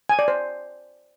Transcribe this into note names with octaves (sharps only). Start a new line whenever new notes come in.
G#5
D5
C5